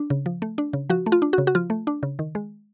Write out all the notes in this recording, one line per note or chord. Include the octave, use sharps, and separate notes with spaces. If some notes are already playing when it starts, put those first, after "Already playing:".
Already playing: D4
C#3
F3
A3
D4
C#3
F3 F#4
A3
F4
D4
C#3 F#4
F#4
F3 F4
A3
D4
C#3
D#3
G#3